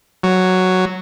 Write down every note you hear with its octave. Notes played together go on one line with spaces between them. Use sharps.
F#3